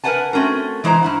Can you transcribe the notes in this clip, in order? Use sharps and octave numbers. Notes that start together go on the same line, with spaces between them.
A#4 B4 D5 F#5 G#5 A5
A3 C4 C#4 F#4 A#4
E3 G#3 E4 C5 A#5
G2 E4 F#5